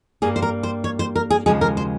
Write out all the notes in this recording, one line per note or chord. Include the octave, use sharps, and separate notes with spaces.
G2 G3 A#3 G#4
C5
A#4
C5
C#5
C5
A#4
G#4
D#2 C#3 F3 G#3 G#4
A#4
C5